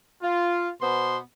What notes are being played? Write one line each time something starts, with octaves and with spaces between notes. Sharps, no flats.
F4
B2 B3 C5 C6